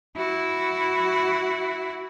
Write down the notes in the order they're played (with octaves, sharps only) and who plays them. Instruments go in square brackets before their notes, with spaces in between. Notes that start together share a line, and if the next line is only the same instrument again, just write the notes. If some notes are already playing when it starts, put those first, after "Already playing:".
[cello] E4 F#4